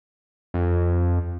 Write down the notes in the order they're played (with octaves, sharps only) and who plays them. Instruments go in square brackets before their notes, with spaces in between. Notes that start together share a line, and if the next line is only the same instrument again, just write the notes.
[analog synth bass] F2